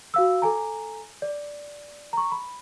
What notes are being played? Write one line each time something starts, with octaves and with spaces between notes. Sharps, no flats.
F#4 F5 E6
A4 G#5 A#5
D5
A#5 C#6
B5